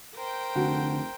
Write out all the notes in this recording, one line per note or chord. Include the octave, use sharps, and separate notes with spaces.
A#4 C5 G5
F1 D3 F#4